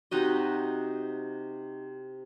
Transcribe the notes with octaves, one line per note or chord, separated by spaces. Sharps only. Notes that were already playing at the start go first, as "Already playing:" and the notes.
C3 D#4 F#4 D#5